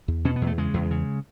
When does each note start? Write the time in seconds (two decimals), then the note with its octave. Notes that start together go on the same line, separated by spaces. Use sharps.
0.08 E2
0.25 B2 C#4
0.36 B3
0.42 E2
0.47 A3
0.58 C#3 G#3
0.74 E2
0.91 C#3